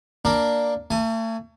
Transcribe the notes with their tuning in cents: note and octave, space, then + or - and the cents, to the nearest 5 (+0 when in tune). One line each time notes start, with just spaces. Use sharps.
A#3 +0 D4 +0 A#4 +0
A3 +40 G#5 +10